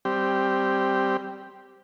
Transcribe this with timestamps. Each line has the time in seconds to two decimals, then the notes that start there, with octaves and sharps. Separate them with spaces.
0.05 G3 C4 G4